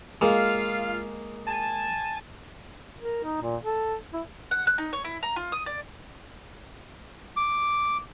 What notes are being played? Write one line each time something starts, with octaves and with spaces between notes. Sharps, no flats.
G#3 A#3 F4 F5
G#5 A5
A#4
D#4
A#2
A4
E4
F#5
F#6
D#4
C#5
E4
A#5
F4
D#6
D5
D6